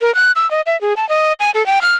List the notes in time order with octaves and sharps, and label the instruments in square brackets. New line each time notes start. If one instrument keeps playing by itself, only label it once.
[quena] A#4
F#6
E6
D#5
E5
G#4
A5
D#5
G#5
A4
G5
F6